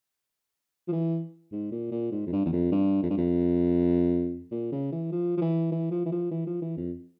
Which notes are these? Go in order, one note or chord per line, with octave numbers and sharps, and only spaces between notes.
F3
E3
G#2
A#2
A#2
G#2
F2
G2
E2
F2
G2
F2
G2
F2
A#2
C#3
E3
F3
F3
E3
E3
F3
E3
F3
E3
F3
E3
F2